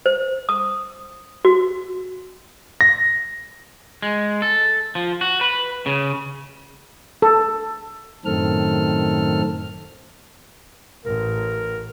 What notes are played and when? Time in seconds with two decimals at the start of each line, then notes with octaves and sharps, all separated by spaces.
0.06 C5
0.49 D#6
1.45 F#4
2.81 A#6
4.02 G#3
4.42 A4
4.95 F3
5.21 F#4
5.41 B4
5.86 C#3
7.22 A4
8.25 F#2 A2 D#3 C4 A4 F6
11.05 A1 A#4